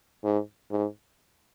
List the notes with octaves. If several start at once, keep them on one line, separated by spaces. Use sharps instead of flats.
G#2
G#2